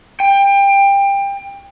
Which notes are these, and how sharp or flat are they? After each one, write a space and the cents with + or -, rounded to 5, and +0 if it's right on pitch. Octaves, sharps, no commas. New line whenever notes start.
G5 +25